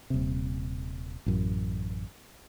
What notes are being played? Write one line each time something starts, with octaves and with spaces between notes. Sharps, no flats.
D#1 C3
A1 F#2